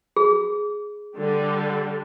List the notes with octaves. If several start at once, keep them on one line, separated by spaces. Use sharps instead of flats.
G#4
D3 G3